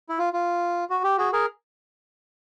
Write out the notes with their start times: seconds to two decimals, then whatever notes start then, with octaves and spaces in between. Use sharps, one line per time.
0.09 E4
0.19 F4
0.33 F4
0.90 F#4
1.04 G4
1.18 F#4 G#4
1.33 G#4 A#4